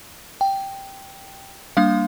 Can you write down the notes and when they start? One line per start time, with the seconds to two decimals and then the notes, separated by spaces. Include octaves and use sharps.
0.41 G5
1.77 G3 A#3 D4 F5